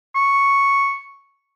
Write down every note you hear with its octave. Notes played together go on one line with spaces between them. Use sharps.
C#6